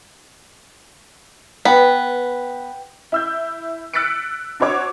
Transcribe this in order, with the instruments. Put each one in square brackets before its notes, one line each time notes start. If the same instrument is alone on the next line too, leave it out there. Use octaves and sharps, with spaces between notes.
[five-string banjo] B3 [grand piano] B4 G5
[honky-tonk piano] E4 E6 G6
E6 F#6 A6 B6 C#7 D7
D4 F#4 C5 C#5 D6